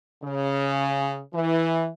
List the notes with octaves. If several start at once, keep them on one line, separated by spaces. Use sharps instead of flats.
C#3
E3